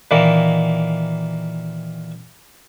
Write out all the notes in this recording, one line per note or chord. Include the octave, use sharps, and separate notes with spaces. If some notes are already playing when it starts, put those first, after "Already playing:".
A#2 D#3 E3 A#3